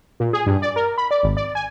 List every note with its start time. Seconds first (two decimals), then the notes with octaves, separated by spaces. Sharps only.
0.20 A#2
0.33 G#4
0.46 G2
0.62 D5
0.76 A#4
0.98 B5
1.11 D5
1.23 G#1
1.37 D5
1.55 G#5